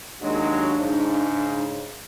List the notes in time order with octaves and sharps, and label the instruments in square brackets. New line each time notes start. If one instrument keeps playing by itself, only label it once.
[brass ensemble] D#2 F#3 G#3 [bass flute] D4
[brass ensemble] G#2 C#3